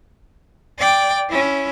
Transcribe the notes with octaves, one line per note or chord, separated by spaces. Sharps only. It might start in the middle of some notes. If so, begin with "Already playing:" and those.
D5 G5
C#4 E4